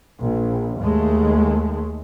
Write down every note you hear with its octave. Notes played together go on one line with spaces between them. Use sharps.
A#1
D#2 G#3 A3